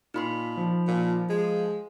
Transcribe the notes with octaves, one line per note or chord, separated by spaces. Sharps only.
A#2 D#4 B5 C6
F3
A#2
G#3